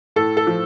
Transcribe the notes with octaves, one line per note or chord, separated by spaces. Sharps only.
A2 A4
A4
F3